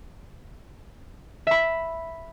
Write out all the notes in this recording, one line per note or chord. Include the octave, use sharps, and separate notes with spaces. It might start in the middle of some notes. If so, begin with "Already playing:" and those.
E5 B5